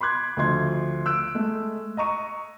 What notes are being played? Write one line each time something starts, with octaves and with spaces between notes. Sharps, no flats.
B5 C6 D6 F#6 G#6
D2 F3 D#5 C6 G#6
E6 F#6 D7
G#3 A3
D#5 A#5 C#6 D#7